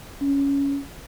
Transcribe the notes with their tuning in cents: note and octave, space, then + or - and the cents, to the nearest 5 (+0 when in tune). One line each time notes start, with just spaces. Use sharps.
C#4 +10